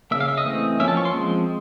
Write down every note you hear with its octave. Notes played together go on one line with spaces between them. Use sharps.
C#3 F3 A#3 E5
F5
E5
D#5
E3 A3 C4
F3 A#3 C#4 E5
A5
C#6
C6
F3 G#3 C4